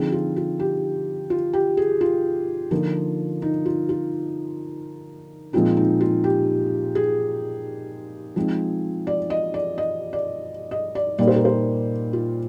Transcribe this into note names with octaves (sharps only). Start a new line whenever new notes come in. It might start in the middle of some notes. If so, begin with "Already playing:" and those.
Already playing: D3 F3 C4 D#4 G#4
F4
F4
G4
F4
G4
G#4
F4
D3 F3 A#3 D#4
D#4
F4
F4
A#2 F3 G#3 C4 D#4 F4
D#4
F4
G4
G#4
F3 G#3 C4 D#4
D5
D#5
D5
D#5
D5
D#5
D5
A#2 G3 A#3 D#4 D5
C5
A#4
C5
F4